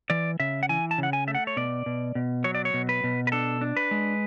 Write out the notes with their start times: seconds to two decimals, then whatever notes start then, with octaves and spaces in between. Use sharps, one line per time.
0.10 E3 D5
0.40 C#3 E5
0.63 F#5
0.69 E3 G#5
0.91 A5
0.98 C#3 F#5
1.13 G#5
1.27 A3 E5
1.35 F#5
1.47 C#5
1.57 B2 D5
1.86 B2
2.15 B2
2.44 F#3 C#5
2.55 D5
2.65 C#5
2.74 B2
2.89 B4
3.04 B2
3.27 B4
3.32 D4 A4
3.61 D4
3.77 B4
3.91 G#3